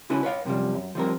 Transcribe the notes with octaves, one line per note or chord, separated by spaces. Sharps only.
C#2 C#4 E4 F#4 B4
B4 C#5 F5
F#2 C3 E3 F3 G3
F#2
F3 G3 C4 A#4